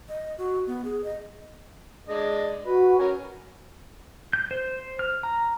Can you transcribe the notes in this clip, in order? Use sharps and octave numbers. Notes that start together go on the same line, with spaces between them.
D#5
F#4
B3
G#4
D#5
G#3 D4 D#5
F#4 B4
C#4 A#4 G#5
G6
C5
F6
A#5